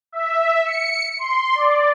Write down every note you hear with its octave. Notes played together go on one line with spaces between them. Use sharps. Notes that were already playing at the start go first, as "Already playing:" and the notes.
E5
C#7
C6
D5